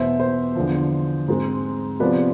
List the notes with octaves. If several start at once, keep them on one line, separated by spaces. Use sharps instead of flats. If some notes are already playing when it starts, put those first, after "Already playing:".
Already playing: E2 B2 B3 C5 E5
C5
E2 D3 F3
G#2 G#3 C4
C3 F3 G#3 B3 B4 D5